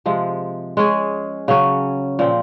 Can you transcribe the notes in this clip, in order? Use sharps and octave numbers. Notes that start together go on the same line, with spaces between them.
C3 F3 G#3
G#3 C#4 G#4
C#3 F#3 C#4
A#2 F3 C4